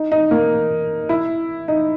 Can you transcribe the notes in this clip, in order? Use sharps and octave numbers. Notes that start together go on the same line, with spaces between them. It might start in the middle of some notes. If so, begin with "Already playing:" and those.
Already playing: D#4
D#4
A#3
E4
D#4